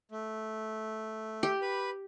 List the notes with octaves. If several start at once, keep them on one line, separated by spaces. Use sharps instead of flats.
A3
G4
B4 B5